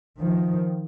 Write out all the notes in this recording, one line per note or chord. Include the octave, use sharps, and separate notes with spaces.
D#3 F3